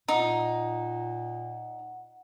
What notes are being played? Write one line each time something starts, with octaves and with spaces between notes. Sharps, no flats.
A#2 D#4 F#5